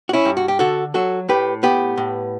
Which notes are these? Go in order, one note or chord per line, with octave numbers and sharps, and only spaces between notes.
F#4
C#4 E4
G2
F#4
G4
D3 F#4 A4
F#3 F#4 A4
A2 G4 B4
B3 G4 B4
A2